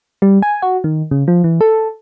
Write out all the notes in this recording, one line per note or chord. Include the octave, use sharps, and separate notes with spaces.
G3
G#5
F#4
D#3
C#3
F3
E3
A4